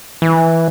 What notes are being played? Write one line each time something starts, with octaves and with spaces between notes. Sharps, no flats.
E3